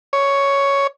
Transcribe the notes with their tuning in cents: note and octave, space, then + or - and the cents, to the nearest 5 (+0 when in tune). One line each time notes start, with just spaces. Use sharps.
C#5 +5